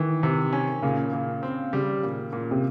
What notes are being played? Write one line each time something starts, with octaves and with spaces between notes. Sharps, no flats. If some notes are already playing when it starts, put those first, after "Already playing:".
Already playing: D#3 E3
C3
C#4
A#2 C#3
A#2
C4
C#3 G3
A#2
A#2
C3